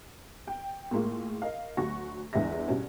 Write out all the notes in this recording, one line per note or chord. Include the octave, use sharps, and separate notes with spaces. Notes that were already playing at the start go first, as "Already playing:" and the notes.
G5
A2 G#3 A#3 F4
A#4 D#5 F5
D2 F#3 F#4 C#6 A#6
G1 E2 G#3 D4 E5 A#6
G2 B2 C#4